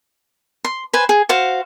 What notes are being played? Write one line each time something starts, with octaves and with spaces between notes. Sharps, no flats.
C6
B4 C5 G#5
G#4
F#4 C5 F5